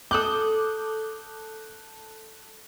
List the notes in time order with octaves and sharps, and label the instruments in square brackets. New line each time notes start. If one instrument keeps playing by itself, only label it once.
[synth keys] A4 F#6 G6 [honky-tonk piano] D6 D#6